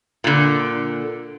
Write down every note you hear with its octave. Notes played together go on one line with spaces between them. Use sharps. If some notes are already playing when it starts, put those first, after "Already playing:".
A#2 D3